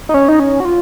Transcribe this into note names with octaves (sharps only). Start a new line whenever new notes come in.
D#4
C#4
D#4
C#4
F#4
F4